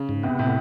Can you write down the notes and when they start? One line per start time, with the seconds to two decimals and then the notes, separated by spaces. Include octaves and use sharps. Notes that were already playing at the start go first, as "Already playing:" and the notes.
Already playing: C#3
0.09 G#2
0.24 C3 B3
0.39 A2 C3